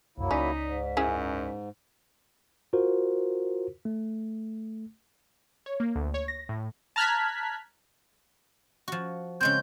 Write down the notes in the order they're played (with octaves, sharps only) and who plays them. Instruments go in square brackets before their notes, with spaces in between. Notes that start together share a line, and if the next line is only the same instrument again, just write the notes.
[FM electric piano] C2 F#2 [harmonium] F#3 A#3 E4
[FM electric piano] C#2 D5 B6 [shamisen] C#4 [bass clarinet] D#4
[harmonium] G#2
[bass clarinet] F#2 [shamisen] C#4 E4 G#4
[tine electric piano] F4 F#4 A#4 C5
A3
[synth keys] C#5
A#3
D2
C#5
A#6
A2
[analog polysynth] A5 A#5 F6 F#6 G#6 B6
[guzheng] F3 F#4
[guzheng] C#3 G#3 C4 [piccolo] G6